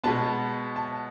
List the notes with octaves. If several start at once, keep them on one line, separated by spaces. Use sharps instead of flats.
B2 G#3 B3 A5
A5